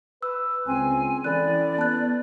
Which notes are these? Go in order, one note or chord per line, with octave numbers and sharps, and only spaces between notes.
B4 E6
C#2 C4 G#5
E3 C#4 E4 A4 D5 F#6
B3 A5 F#6